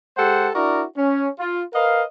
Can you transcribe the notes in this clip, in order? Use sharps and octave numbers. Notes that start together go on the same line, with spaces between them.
G#3 G4 A4 C5 F#5
D4 E4 F#4 A#4 D5
C#4
F4
A#4 B4 D#5 F5